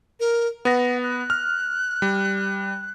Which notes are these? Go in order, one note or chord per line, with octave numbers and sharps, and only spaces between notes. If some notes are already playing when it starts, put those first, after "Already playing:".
A#4
B3 F#5 A#6
F#6
F6
G3